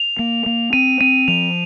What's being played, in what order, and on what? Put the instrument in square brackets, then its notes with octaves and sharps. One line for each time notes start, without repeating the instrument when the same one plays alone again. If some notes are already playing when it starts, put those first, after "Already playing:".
Already playing: [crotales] F7
[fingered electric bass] A#3
A#3
[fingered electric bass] C4 [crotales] D#7
[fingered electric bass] C4 [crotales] D#7
[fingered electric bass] F3 [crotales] F7